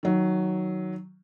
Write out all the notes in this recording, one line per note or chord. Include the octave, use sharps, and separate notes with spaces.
D#3 F#3